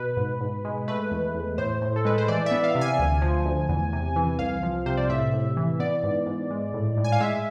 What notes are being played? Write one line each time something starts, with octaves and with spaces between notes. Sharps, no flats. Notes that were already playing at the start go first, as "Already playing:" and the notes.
Already playing: B2 B4
G#2
G#2
G#3
A3 B4
E2
E2
A2 C5
A2
A4
G#3 B4
C5
E3 D5
B3 E5
F5
C3
G#5
D2
F3
D2
E2
C3
E3
C2 F5
F3
C3 C5
D5
A2 E5
A2
E3
B3 D5
G#2
G#2
G#3
A2
A2
G#5
F5
G#3 E5